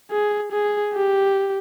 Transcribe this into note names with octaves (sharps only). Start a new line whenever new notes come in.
G#4
G#4
G4